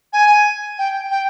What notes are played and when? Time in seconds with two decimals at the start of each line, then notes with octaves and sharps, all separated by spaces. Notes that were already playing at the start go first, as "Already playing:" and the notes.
0.13 G#5
0.79 G5
1.11 G5